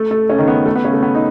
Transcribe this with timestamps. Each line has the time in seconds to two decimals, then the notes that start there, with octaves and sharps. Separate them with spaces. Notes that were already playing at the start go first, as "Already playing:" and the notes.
Already playing: A3 A4
0.11 A3 A4
0.29 C#3 C#4
0.38 D#3 D#4
0.48 B3
0.66 A3
0.76 B3
0.84 C#3 C#4
0.93 A3
1.03 B3
1.15 D#4